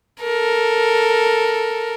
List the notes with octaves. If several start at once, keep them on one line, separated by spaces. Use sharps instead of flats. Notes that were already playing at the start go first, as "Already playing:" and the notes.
A4 A#4